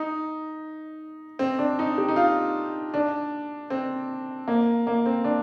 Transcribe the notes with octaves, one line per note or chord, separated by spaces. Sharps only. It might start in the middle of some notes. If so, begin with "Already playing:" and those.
Already playing: D#4
C4
D4
D#4
G4
D#4
F4
D4
C4
A#3
A#3
C4
D4